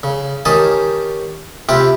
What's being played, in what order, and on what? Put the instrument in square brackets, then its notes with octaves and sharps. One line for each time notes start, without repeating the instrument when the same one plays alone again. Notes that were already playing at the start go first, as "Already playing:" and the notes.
[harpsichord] C#3
D#3 C#4 G4 D#5 G#5 A5
C3 E4 F4 G4 G5